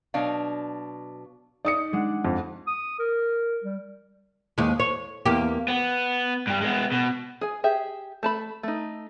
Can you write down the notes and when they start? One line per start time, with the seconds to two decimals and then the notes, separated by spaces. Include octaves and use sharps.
0.14 B2 F#3 D4 F5
1.65 D#4 D5 D#6 C#7
1.93 G#3 D4 F#5
2.25 F2
2.67 D#6
2.99 A#4
3.64 G3
4.58 D#2 G#3
4.80 C#5
5.26 E2 A#3 G4
5.68 B3
6.47 G2 G3
6.61 G#3 B3
6.92 B2
7.41 G#4 G#5
7.64 G4 G#4 E5
8.23 A3 A5 B5
8.63 A3 D#4